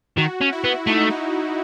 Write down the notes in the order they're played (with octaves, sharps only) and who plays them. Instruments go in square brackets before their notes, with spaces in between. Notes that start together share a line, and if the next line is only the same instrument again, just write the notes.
[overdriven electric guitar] D#3 [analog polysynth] F#4
[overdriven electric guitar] C#4
[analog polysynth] E4
[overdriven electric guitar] B3
[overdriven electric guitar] A3 [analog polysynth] D#4
[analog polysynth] D#4